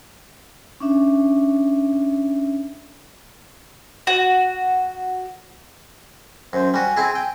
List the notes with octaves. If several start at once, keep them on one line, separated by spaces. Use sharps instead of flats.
C#4 D4 E5
F#4
F#2 C5
G3 F#4 G#5
C4 E4 G#4
G5